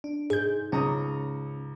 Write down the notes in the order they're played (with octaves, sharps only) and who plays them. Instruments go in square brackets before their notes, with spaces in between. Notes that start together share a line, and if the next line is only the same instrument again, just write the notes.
[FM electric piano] D4
[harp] G#2 [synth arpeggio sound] G#4 G6
[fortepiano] C#2 A#5 D#6 [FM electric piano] C#4